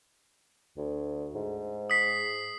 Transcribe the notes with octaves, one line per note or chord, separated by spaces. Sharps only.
D2
G#2
D#6 B6 C7